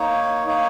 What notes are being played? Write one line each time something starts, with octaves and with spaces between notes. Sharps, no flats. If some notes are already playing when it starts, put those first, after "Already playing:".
Already playing: A#3 D#4 C#5
A#3 D#4 C#5